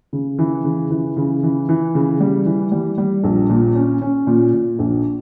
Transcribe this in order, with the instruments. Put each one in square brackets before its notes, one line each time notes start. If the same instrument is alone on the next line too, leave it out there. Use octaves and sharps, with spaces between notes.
[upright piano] C#3
E3
C#3
E3
C#3
E3
E3
C#3
G3
E3
G3
G3
A#1
A#2
C#4
C#4
A#2
A#2
A#1